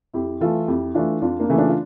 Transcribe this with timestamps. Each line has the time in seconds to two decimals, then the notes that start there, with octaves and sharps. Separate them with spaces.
0.14 F2 E4 G4
0.41 E3 A3 F4 A4
0.68 F2 E4 G4
0.94 E3 A3 D4 F4
1.21 F2 D4 F4
1.40 A#3 D4
1.49 C#3 E3 A3
1.58 D4 F4
1.68 F4